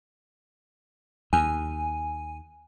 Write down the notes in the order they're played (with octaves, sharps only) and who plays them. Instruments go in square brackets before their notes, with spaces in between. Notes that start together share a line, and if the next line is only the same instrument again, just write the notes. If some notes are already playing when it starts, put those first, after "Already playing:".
[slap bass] D#2 [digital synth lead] G#5